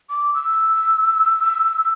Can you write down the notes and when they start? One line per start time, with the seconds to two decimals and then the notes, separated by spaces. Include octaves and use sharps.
0.10 D6
0.34 E6